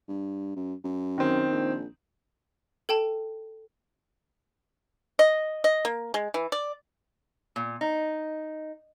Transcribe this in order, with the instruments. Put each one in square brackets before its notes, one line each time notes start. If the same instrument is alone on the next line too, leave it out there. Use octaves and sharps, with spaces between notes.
[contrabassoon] G2
F#2
F#2
[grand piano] D#3 C4
[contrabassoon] A#1
[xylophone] A4 G5 A5
[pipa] D#5
D#5
A#3
G#3
E3
D5
[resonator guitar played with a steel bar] A#2
D#4